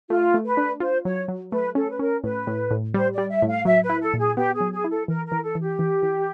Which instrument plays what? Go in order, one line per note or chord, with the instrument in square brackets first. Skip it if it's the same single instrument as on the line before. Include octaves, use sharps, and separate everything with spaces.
[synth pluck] A3 [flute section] F4
[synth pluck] A3
[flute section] B4
[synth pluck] D4
[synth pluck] F4 [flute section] C5
[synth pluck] F#3 [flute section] C#5
[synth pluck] F#3
[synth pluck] A3 [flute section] B4
[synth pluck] C#4 [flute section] A4
[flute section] B4
[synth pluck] C#4 [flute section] A#4
[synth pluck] A2 [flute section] B4
[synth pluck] A2
A2
[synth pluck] G3 [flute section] C5
[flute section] D5
[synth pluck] G3
[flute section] E5
[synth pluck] A2
[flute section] F5
[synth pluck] F#3 [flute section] E5
[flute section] B4
[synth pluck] E4
[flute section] A4
[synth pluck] A#2
[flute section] G#4
[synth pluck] B3 [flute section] G4
[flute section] G#4
[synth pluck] F#3
[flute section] G#4
[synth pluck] E4
[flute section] A4
[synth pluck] E3 [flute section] A#4
[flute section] A#4
[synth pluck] E3
[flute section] A4
[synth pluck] E3
[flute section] G4
[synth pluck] E3
E3